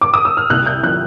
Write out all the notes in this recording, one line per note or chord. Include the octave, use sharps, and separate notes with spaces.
D6
D#6
E6
F6
C2 F#6
G6
F3 F#6